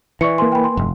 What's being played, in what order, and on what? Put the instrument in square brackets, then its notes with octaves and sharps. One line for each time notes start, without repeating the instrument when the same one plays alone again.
[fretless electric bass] E3 [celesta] D5 C#6 C#7
[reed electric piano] A#3 B4 G#5 [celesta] C6
[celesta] G5 B5
C6
[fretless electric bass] F1 [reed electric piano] G2